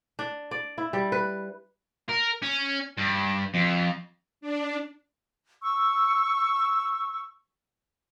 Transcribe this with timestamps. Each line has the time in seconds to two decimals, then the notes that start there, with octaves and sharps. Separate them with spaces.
0.19 D4
0.51 D5
0.78 E4
0.93 G3
1.12 B4
2.09 A#4
2.42 C#4
2.97 G2
3.54 F2
4.41 D4
5.62 C#6 E6